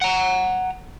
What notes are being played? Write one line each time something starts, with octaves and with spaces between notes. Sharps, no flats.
F#5 A#5